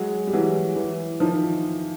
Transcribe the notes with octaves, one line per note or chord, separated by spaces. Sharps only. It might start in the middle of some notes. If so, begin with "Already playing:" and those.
Already playing: F#3 G#3
G3
E3 F#3
E3
D#3 F3